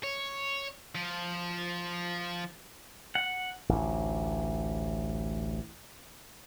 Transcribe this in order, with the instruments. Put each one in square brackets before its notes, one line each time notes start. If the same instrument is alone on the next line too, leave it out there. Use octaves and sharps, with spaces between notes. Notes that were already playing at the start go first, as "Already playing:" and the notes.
[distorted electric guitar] C#5
F3
[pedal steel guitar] F#5
[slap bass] A1 D2